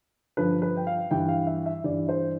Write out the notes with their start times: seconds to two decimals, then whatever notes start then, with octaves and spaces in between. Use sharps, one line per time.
0.37 G2 D3 F3 B4
0.62 B4
0.77 G5
0.87 F5
1.11 G2 E3 G5
1.29 F5
1.47 E5
1.66 E5
1.84 G2 E3 D5
2.09 C5